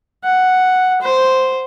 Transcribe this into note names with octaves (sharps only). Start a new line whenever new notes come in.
F#5
C5